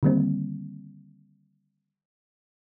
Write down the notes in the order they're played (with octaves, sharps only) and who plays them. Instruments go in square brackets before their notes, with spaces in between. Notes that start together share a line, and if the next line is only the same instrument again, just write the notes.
[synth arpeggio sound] D3 D#3 G3 A#3 C4